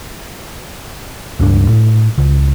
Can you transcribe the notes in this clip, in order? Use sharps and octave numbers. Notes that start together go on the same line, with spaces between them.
C#2 G2 D4
A2
C#2